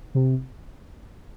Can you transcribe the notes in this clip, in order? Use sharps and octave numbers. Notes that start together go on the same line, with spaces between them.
C3